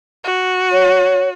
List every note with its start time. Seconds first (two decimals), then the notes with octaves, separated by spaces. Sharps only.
0.24 F#4
0.72 C#5